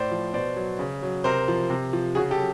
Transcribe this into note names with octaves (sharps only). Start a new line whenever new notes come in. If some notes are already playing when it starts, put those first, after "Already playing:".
Already playing: A2 C5 D5
F3
B2 C5 D5
F#3
C#3
F#3
C3 A#4 C5
F3
C3
F3
C#3 F#4 G#4
G4 A4
F#3